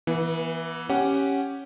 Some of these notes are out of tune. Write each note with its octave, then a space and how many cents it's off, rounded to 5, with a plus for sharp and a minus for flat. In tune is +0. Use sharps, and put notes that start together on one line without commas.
E3 +0 B3 -35
C#4 +0 G4 +0 F#5 +0